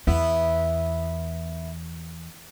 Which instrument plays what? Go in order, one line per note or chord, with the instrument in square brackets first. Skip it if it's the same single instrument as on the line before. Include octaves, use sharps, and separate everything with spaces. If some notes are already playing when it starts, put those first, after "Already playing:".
[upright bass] E2 [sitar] B3 E4